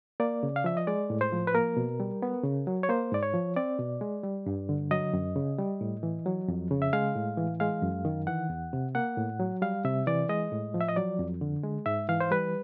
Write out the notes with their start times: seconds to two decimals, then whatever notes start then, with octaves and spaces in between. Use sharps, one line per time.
0.20 A#3 D5
0.43 C#3
0.56 F5
0.64 F3 E5
0.77 D#5
0.87 G#3 D5
1.10 A2
1.21 C5
1.32 F3
1.47 B4
1.54 A#3 A#4
1.77 B2
2.00 G3
2.22 B3
2.44 C#3
2.67 F#3
2.83 C#5
2.89 A#3 C5
3.12 G#2 D5
3.23 C#5
3.34 F3
3.56 C4 D5
3.79 B2
4.01 G#3
4.23 G3
4.46 G2
4.69 D3
4.91 F#3 D#5
5.13 F#2
5.36 C#3
5.59 G3
5.81 A2
6.03 E3
6.26 F#3
6.48 F2
6.71 C#3
6.82 E5
6.93 G#3 F5
7.16 A2
7.38 E3
7.60 G#3 F5
7.82 F#2
8.05 D#3
8.27 E3 F#5
8.50 E2
8.73 C3
8.95 A#3 F#5
9.18 A2
9.40 F#3
9.62 G3 F5
9.84 C3 E5
10.07 E3 D5
10.29 G#3 D#5
10.51 A2
10.74 F3
10.81 E5
10.88 D#5
10.96 F#3 D5
11.19 F2
11.41 D3
11.63 G#3
11.86 G#2 E5
12.09 E3 F5
12.21 C5
12.31 G3 B4